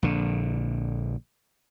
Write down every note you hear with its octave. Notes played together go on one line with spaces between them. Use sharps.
A#1 D3